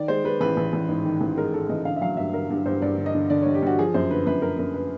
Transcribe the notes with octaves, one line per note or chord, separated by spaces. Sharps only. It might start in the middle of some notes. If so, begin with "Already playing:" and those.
Already playing: D#3 D5
G#3 C5
G#3 B4
A1 B4
A1
A1
G#2
D#3
A1
G#3 A#4
G#2 A4
A1 D#5
D3 F5
E5
F#3 F5
G2 E5
D3 A#4
G2
G2 C5
G2 D5
D3
D#5
D3
D3 D5
G2 C#5
G4
G2 F#4
F3 G#4
F#2 C5
D3 B4
F#2 B4
F#2 A#4
F#2 A#4
B4